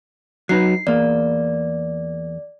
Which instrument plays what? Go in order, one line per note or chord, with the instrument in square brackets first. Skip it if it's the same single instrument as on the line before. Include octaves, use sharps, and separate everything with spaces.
[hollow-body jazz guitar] F#3 D#4 B4 [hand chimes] C7
[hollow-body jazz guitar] E2 A#3 [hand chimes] D5